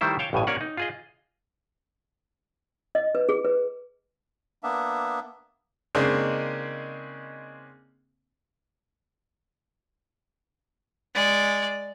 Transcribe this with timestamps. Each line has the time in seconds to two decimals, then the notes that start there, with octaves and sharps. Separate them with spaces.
0.01 D#3 G3 A3 E4 C5
0.19 C#5 F5 G5 A5
0.33 A1 G2 B2 G#5
0.47 A#3 C#4 C#5 D5 F#5
0.61 D#4
0.77 F4 G#4 D#5
2.95 D#5
3.15 B4
3.29 G#4
3.45 B4
4.63 A#3 B3 D4 E5
5.95 C#3 G#3 A#3 C4 D4 D#4
11.14 G#3 D5